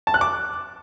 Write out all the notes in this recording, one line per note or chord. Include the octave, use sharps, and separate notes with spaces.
A5
F#6
D6